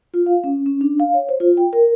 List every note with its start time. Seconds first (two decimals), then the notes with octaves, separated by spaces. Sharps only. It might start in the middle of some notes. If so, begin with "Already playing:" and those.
0.14 F4
0.26 F5
0.44 C#4
0.66 C#4
0.81 D4
1.00 F5
1.14 C#5
1.29 C5
1.40 F4
1.57 G5
1.73 A#4